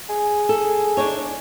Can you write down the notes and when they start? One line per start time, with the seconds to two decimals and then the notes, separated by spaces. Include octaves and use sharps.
0.09 G#4
0.49 A4
0.97 D4 D#4 C#5